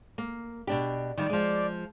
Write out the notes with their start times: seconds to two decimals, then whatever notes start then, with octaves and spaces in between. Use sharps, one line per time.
0.18 A#3
0.67 B2 D4 G4
1.17 D#3 F3 G3 D5
1.29 F3 G#3